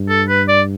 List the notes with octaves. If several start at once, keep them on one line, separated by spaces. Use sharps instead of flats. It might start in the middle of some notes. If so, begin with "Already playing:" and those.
Already playing: G2
A4
B4
D5